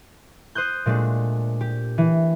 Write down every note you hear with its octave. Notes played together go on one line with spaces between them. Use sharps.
C5 D#6 F#6 G6
A#2 G#3 A3 D4
G4
E3